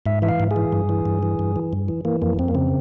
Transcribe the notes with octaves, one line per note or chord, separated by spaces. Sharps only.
G#2 E5
E3 E5
F5
G#2
G#4
E3
G2
E3
G2
E3
G2
E3
G2
E3
E3 A#3
F2 A#3
F2 C4
A#3
C#3 C4